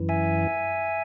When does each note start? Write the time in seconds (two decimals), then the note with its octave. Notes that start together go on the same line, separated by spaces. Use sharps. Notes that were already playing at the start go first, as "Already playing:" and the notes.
Already playing: F#2 E3
0.09 E5 G#5